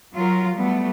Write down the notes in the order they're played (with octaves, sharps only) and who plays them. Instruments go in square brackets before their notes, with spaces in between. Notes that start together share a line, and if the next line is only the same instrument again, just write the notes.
[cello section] F#3 F4 A#4
F#3 G3 A3 B3